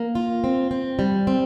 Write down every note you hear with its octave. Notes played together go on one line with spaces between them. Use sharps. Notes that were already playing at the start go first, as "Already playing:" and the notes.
Already playing: A#3
F4
C4
C4
G3
C4